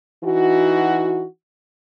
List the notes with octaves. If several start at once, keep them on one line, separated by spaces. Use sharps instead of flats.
E3 D#4 F#4